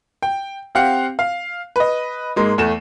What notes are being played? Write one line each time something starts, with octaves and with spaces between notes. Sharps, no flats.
G5
C4 G4 F5 F#5
F5
B4 D#5
G#2 G#3 A#3
E2 A3 E7